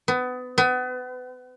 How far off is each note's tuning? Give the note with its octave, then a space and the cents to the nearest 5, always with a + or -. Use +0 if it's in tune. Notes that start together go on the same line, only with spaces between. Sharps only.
B3 +25
B3 +30